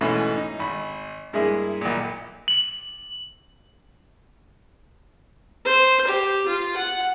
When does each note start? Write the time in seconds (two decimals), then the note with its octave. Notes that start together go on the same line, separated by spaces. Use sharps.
0.01 G#2 B2 E3 A3 C#4
0.36 D#4
0.59 G#1 B5
1.33 G2 G#3 A#3 E4 G#4
1.81 B1 A#2
2.48 F#7
5.65 C5
6.07 G4
6.46 F4
6.77 F#5